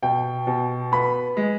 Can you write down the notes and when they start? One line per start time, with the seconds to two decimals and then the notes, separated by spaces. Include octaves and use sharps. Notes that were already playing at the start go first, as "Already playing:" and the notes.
0.02 B2 G5
0.47 B2
0.92 B3 B5
1.37 G#3